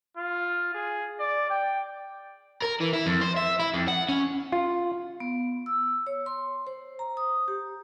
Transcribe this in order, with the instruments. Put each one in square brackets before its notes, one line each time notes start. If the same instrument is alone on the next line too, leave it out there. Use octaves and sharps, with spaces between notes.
[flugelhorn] F4
G#4
D5
G5
[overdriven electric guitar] A#4
E3
E4
F2
C5
E5
E4
F2
F#5
C#4
[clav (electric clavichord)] F4
[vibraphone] B3
E6
C#5
C6
C5
A#5
D#6
G4